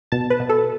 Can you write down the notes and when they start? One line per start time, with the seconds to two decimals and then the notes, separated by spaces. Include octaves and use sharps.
0.12 B2 A5
0.30 B4
0.40 B2
0.49 A4